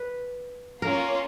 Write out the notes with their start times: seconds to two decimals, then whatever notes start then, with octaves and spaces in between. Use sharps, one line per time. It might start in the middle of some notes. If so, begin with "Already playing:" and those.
Already playing: B4
0.82 A#3 C#4 F4 A#4